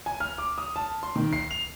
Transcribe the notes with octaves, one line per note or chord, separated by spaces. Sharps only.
G#5
F6
D6
D#6
A5
C6
D#3
C7
F7